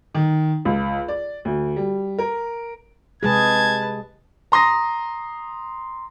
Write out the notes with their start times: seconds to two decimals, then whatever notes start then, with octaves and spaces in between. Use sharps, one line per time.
0.14 D#3
0.65 C#2
1.08 D5
1.45 D2
1.76 G3
2.18 A#4
3.23 C3 G#3 G#4 B4 A5 G#6
4.52 A#5 C6 D#6 A#6